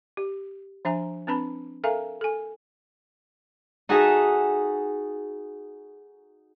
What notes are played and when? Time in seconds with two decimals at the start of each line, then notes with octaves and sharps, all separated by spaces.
0.17 G4
0.85 F3 D4 E5 G#5 A#5
1.27 C4 D4 B4 A5 B5
1.84 A4 A#4 E5 F5 G#5 A#5
2.21 A4 G#5
3.89 D#4 F#4 G#4 A4 E5